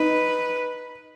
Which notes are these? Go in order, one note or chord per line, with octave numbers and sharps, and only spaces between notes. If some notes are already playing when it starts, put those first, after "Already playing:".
Already playing: D#4 B4